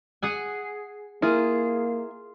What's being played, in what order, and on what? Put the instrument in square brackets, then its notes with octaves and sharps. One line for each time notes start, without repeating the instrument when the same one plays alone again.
[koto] G#4 F#5 G#5
[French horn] A#3 [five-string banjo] E4 A#4 [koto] F4 G#4